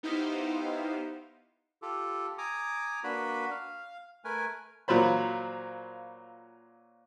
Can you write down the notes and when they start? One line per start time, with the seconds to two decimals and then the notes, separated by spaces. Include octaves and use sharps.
0.03 B3 D#4 E4 G4 C5 F5
1.82 F4 G4 A4
2.38 G#5 A#5 D6 D#6
3.04 A#3 D4 F#4 B4 B5
3.51 F5
4.24 A3 A#4 B4 G#5
4.88 A#2 F#3 F4 C5 B5